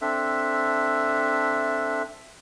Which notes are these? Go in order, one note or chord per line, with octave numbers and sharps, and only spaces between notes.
C4 D4 A4 E5